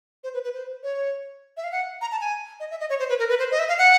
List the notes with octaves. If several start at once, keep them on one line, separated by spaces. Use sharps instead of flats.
C5
B4
B4
C5
C#5
E5
F5
F#5
A#5
A5
G#5
D#5
E5
D#5
C#5
C5
B4
A#4
B4
C5
D#5
E5
F5
F#5